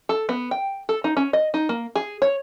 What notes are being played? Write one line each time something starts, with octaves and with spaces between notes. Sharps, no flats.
A4
B3
G5
A4
D#4
C#4
D#5
D#4
A#3
G#4
C#5